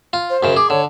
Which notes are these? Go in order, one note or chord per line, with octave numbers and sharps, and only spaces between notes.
F4
C5
F#2 C#3
G#4 D6
D3 C#5